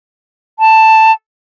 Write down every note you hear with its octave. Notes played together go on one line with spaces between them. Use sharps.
A5